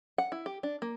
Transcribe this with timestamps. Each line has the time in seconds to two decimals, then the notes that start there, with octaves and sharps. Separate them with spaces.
0.18 F#5
0.32 E4
0.46 G4
0.63 D4
0.82 A#3